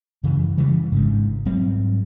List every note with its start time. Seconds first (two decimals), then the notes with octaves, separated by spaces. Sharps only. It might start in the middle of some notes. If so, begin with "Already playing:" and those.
0.23 F#2 C#3 E3
0.58 C#3 E3 G3
0.92 G#1 G#2 C#3
1.45 G#2 F#3 G3 C4